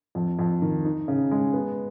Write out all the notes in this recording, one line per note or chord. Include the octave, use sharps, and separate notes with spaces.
F2
F2
D#3
D#4
C#3
G#3
B3